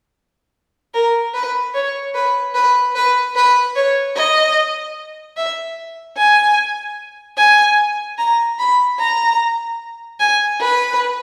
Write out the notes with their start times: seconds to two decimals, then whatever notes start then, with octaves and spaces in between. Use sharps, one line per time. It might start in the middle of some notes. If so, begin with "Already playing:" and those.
0.94 A#4
1.34 B4
1.74 C#5
2.15 B4
2.54 B4
2.95 B4
3.36 B4
3.76 C#5
4.16 D#5
5.37 E5
6.17 G#5
7.38 G#5
8.18 A#5
8.59 B5
8.99 A#5
10.20 G#5
10.60 B4